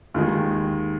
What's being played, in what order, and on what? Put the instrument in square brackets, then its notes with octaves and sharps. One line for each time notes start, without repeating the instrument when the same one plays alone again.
[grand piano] D#2 D#3 G#3